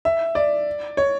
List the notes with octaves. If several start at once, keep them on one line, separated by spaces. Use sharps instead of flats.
E5
D5
C#5